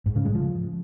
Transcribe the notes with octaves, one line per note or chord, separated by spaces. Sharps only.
G#2
C#3
G#3
F3